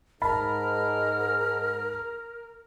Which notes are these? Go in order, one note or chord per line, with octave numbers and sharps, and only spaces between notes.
G#2 A#4 A5 B5 F6